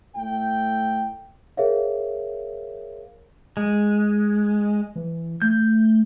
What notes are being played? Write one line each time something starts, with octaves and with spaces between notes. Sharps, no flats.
A2 A3 G5
G#4 A#4 C5 C#5 E5 F5
G#3
E3
A3 G6